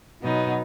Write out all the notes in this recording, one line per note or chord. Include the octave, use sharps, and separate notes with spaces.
B2 F#3 B3 D#4